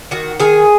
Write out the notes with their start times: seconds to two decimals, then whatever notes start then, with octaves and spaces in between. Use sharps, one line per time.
0.11 D#3 F#4
0.40 D#3 G#4